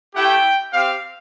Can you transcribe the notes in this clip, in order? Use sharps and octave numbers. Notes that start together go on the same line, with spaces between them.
A3 E4 G4 G5
C4 G4 F5